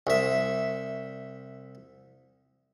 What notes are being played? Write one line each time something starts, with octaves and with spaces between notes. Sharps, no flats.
C2 E5